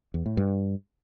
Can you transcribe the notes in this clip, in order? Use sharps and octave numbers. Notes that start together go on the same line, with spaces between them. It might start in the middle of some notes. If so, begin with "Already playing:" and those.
E2
A2
G2